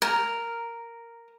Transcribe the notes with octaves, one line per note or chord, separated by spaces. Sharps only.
A#4